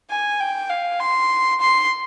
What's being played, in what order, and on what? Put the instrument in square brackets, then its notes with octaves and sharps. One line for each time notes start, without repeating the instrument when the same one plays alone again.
[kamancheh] G#5
G5
F5
C6
C6